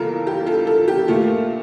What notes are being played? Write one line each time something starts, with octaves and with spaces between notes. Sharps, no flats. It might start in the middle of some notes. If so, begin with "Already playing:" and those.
Already playing: E2 C#3 G3 A#3 F4 A4 A#4
G4
F4 A4
F4 A4
G4
A#2 A3 F4